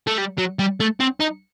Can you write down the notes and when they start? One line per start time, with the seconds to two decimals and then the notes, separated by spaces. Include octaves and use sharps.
0.07 A3
0.18 G3
0.38 F#3
0.59 G3
0.80 A3
1.00 C4
1.20 D#4